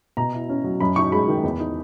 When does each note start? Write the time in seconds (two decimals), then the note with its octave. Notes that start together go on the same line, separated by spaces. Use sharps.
0.17 B2 A#5
0.34 E4
0.49 C#4
0.64 F#3
0.80 F#2 B5
0.96 D#4 C#6
1.12 G#3 B5
1.28 D#3
1.43 E2
1.59 D#4